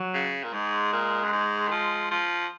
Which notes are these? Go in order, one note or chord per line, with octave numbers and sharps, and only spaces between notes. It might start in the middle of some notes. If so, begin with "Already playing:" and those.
Already playing: F#3
C#3
A#2
G#2 G#3
A#2
F#2
G#2
D#3
F3
F3